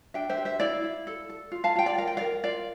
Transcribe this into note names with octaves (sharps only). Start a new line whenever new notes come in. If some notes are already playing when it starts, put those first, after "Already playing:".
D4 E5 G5
C5 E5
G4
C5 E5
E4 D5 F5
E4
A4
A4
F4
F5 A5
F4 G5
D5 F5
A#4 F5
G5
A#4 D5 F5
F4 D5 F5